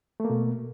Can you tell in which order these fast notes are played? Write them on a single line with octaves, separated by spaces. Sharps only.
A3 A#3 B2